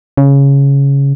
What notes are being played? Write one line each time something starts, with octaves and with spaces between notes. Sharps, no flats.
C#3